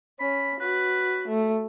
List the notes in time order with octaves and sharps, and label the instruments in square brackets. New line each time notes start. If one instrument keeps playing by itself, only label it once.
[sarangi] C#4 [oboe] B5
[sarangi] F#4 [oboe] B4
[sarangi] A3